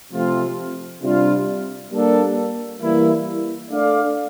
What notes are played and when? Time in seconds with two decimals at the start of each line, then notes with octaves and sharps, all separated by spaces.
0.13 C3 F3 A3 C4 F4
1.02 C3 G3 D4 F4
1.91 G3 A#3 D4 A4
2.80 E3 G3 A#3 E4
3.70 A3 D4 A4 D5 F5